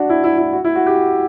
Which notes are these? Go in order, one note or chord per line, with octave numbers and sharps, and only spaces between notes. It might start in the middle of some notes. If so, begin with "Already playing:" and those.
Already playing: D4 F#4
E4
E4
E4
F#4
E4
F#4
G4